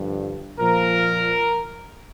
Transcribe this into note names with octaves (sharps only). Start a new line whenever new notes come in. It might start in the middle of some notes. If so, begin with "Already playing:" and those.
Already playing: G2 D3 F3
A#2 F3 A#4